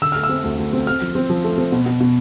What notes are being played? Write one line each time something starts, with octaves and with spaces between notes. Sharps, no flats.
D3 E6
A3 F6
E6
C4
D2
D2
C4
C4 F6
F3
C4
F3
A3
C4
B2
B2
B2